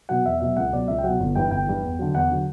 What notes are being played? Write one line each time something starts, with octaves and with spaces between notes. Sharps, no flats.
B2 F#3 F#5
E2 E5
B2 F#3 E5
C#2 F#5
B2 F#3 D5
C#2 E5
G5
B2 F#3 F#5
G1
G2 E3 G5
G1 G5
G2 E3
E2
D3 F#3
E2 F#5
D3 F#3